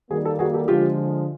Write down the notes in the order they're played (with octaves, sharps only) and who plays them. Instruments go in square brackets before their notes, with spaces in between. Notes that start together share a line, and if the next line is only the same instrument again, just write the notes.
[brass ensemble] D#3 G3 A#3 [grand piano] F#4 G#4
[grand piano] G4 A4
F#4 G#4
G4 A4
[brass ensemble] D3 F3 G#3 [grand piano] F4 G4